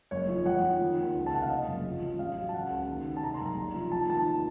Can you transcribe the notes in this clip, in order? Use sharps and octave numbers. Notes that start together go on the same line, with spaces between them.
F#1 C#5
F3
F2 F#5
F3
D#3
D#2
C#2
A5
C3 F#5
F5
C#3 D#5
F#1
F3
A1
A1 F5
F#3
A5
C#3 F#5
C#2
D#2
D#2
A5
C3 A#5
C6
F#1 A#5
C2
F3
F3 A5
D#2 A5